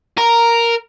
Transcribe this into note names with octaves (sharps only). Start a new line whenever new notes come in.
A#4